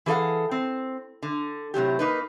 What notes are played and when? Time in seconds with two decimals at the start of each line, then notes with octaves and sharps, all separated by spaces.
0.06 E3 G#4 A4 F5 F#5
0.51 C4
1.22 D3
1.74 A2 C3 F#3 G4
1.99 A#3 D#4 B4